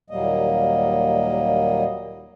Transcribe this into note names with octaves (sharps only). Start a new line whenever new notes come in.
D#2 A#2 F#3 G3 A#3 D#5